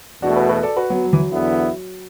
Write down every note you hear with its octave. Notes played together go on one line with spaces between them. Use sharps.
E2 B2 A3 D4 F#4
F#4 B4
F#4 B4
A4 D5
F#4 B4
F#3 B3
F#3
E3
F#3
E2 D3 B3 E4